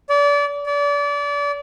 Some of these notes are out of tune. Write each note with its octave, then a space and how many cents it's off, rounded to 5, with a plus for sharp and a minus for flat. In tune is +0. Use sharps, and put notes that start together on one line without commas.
D5 -30
D5 -30